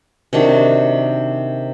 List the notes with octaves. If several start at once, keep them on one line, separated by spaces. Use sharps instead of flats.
C3 D#3 D4 F#4